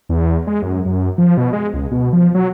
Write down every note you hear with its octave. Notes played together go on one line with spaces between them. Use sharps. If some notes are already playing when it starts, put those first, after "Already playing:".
E2
G#3
F#2
F#2
F3
B2
G#3
C#2
B2
F3
F#3